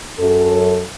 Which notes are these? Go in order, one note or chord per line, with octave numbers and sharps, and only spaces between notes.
F#2 A4